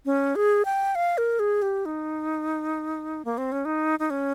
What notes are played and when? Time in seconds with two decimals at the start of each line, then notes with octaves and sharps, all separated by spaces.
0.05 C#4
0.36 G#4
0.65 G5
0.95 F5
1.18 A#4
1.39 G#4
1.62 G4
1.86 D#4
3.25 A#3
3.38 C4
3.52 C#4
3.65 D#4
3.99 D#4
4.10 C#4